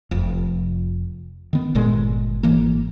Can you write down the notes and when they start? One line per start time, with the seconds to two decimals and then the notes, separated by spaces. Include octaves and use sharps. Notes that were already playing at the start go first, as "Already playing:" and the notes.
0.11 F1 F2
1.53 D#3 B3
1.75 G1 A#2 G#3
2.43 G#1 E3 A#3